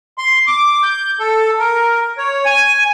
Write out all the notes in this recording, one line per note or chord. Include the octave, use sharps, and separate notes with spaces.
C6
D6
G6
A4
A#4
C#5
G#5